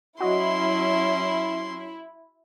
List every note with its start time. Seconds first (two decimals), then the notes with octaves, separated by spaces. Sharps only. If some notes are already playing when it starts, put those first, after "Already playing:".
0.21 F#3 C#4 E4 F#4 D#5 C6